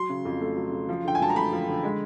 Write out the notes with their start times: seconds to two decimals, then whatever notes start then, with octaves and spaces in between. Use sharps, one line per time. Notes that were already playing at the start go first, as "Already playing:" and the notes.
Already playing: F#3 C6
0.09 C#3
0.25 F2
0.41 A3
0.57 F#3
0.72 C#3
0.89 F3
1.05 D3 G5
1.15 G#5
1.20 F#2 A5
1.29 A#5
1.36 A3 B5
1.53 F3
1.69 D3
1.83 G#3